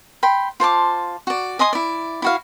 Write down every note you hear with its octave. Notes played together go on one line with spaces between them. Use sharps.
G5 B5 C6
F4 C5 A5 D6
F#4 D5
D#5 G#5 C6 D#6
E4 D5
E4 F#4 F5